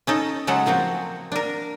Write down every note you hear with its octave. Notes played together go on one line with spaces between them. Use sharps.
C#4 D#4 A4
C#3 F#3 G#3 A4 F#5
F3 A#3 C4 F#4
D4 A#4